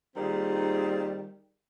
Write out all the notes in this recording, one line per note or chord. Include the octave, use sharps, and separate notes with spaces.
D#2 D#3 G3 C4 F4 G#4